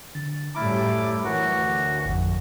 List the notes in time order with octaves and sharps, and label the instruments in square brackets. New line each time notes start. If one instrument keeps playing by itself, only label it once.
[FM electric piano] D3 A6
[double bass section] F#2 A2 G3 [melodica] E4 D6 [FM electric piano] A#5 F6 A6
[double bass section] E3 [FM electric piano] A3 A#4 C#5 [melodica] F#4
[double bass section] D2
[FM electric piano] G#1 F2